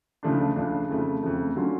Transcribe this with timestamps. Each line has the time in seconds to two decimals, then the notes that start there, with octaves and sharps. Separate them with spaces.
0.23 C#2 C#3 F3 A3 D4
0.56 C#2 C#3 F3 A3 D4
0.89 F2 C#3 F3 A3
1.23 F2 C#3 F3 A3
1.56 D3 F#3 C#4 F4